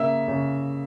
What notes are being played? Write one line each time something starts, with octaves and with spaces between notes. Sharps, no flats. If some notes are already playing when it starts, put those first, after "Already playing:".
Already playing: C#3 A#3 E5
C#3